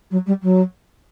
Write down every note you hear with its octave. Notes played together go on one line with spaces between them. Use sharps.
F#3
G3
F#3